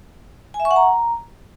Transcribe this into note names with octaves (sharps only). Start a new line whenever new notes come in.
G#5
E5
C#6
F#5
A#5